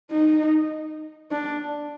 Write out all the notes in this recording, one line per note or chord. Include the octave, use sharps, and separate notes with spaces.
D#4
D4